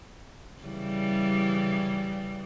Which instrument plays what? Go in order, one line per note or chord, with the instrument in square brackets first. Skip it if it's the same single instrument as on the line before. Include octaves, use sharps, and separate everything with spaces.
[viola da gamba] C#3 E3 G3